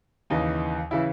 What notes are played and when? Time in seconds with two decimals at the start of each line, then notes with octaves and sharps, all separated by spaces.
0.30 D#2 C#3 E3 D#4
0.91 C#3 E3 E4